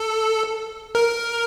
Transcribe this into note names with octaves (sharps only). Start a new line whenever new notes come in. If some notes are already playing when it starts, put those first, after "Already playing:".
Already playing: A4
A#4